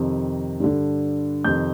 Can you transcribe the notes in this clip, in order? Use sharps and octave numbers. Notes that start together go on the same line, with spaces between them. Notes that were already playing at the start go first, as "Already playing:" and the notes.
Already playing: F2 C3 D#3
G2 D3
F2 C3 D#3 G6